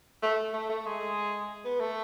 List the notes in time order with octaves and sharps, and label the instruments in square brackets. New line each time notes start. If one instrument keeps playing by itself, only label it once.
[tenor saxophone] A3
A3
A3
G#3
B3
A3